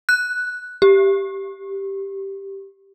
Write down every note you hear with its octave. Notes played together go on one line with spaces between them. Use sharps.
F#6
G4